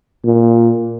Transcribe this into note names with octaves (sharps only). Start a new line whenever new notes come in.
A#2